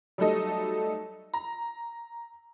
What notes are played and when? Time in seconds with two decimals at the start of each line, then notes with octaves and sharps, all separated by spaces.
0.18 F#3 G3 A3 D#4 A4 D#5
1.34 A#5